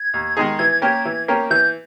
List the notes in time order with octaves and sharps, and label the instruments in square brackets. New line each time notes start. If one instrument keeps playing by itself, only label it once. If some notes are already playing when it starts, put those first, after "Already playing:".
Already playing: [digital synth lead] G#6
[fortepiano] D#2
D#3 G#3 D#4 G#4
[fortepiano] E3 [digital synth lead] G#6
[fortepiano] A#3 C#4 G4 A#4
E3
A#3 C#4 G4 A#4
[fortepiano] E3 [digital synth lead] G6